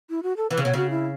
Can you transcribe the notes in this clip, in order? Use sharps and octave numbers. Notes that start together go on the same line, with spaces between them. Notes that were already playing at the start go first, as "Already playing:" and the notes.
E4
F#4
A4
E3 B4
C#3
B2 C#5
C#3 F#4
E4